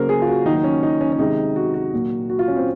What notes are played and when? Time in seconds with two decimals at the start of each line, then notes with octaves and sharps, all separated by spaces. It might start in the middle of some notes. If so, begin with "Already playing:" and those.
Already playing: C#3 F#3 A#3 A#4 C5
0.09 G#4
0.22 F4
0.27 F#4
0.46 D#3 F#3 A#3 D#4
0.56 D#4
0.64 C#4
0.83 D#4
1.01 C#4
1.12 C#4
1.19 C3 D#3 G#3 D#4
1.56 F#4
1.74 F#4
1.93 A#2 F#3 A#3
2.30 F#4
2.39 F4
2.48 C#4
2.57 C4